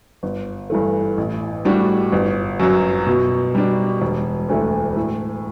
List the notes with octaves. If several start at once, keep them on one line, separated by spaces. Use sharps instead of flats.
G1
G2 E3 A3
A1
A2 G3 D4 F#4
G1
F#2 F#3
B2
G3 D4
E1
D2 D3 A3 E4
A2